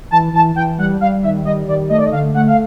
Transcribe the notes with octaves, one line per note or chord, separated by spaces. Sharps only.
E3 A5
E3 A5
E3 G5
G3 F#5
G3 F5
D#3 E5
G3 D#5
D#3 D5
A3 D#5
D5
D#5
D3 F5
A3 F#5
F5